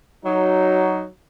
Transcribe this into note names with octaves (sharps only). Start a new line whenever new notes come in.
F#3 D#4